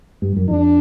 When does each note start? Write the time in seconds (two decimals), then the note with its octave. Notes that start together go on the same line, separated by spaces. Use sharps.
0.22 G2
0.36 F#2
0.50 F2 D4